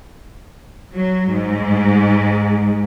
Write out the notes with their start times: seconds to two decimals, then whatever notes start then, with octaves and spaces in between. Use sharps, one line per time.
0.93 F#3
1.31 G#2